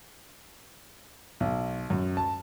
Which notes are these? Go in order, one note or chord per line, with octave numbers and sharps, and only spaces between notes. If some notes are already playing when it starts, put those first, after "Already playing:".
B1
F#2
A5